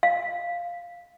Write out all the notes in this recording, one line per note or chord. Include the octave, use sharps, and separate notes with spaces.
F5